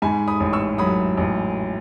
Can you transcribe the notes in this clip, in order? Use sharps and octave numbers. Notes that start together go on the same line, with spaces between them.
G#2 G#5 B5
B5 D#6
A1
C#6 E6
F#3 B5 D#6
A1